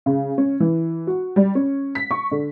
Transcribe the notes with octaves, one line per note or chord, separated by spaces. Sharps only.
C#3
C#4
E3
F#4
G3
C#4
B6
C#6
D3